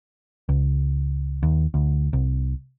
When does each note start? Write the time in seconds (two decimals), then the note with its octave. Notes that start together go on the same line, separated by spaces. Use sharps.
0.49 C#2
1.43 D#2
1.74 D2
2.13 C2